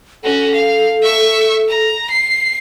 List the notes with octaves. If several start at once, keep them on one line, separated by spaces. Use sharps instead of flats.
C#4 F#4 A4
F5
E5 C#6
A#5
C7